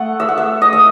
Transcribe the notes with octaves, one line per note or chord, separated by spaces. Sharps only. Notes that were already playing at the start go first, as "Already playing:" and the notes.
Already playing: A3 F#5
E5
F#5
E5
D#5
E5